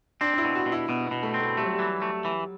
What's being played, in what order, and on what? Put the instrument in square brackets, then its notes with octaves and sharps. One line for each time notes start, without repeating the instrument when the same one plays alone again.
[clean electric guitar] C4 [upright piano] D4
[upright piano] D4
E4
[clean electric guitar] B2
[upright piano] F#4
[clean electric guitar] B2
[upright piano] E4
[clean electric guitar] B2 [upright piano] B3
[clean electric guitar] B2 [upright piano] B3
[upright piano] A3
[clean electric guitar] C4
[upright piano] A3
[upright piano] G3 [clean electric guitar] A3
[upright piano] F#3
G3
[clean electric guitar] E3
A3
E3